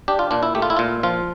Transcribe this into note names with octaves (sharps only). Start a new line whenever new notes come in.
D4 G4
F4
A#2 D4
E4
A3 G4
F4
E4
A#2 F4
F3 F4